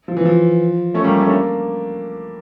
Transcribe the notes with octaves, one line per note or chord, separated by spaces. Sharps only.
F3
E3
F3
A3 C#4
G3 A#3
A3 C#4
A#3 D4